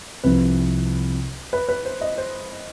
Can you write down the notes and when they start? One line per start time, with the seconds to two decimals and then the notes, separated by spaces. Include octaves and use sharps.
0.24 C2 C3 F3 B4
1.53 B4
1.68 B4
1.85 C5
2.01 D#5
2.18 C5